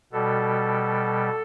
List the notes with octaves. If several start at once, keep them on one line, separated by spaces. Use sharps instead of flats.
B2 G3 A4